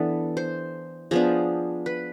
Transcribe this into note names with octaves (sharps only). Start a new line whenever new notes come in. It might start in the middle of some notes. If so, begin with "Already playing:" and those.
Already playing: E3 B3 D4 A4
C5
F3 B3 D4 G#4
B4